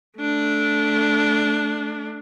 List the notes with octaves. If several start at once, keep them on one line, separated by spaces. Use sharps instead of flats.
A3 D4